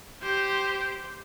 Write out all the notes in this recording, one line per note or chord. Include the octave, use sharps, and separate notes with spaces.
G4 C5